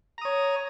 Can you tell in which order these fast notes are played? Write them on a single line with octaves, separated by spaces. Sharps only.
A#5 D#6 C#5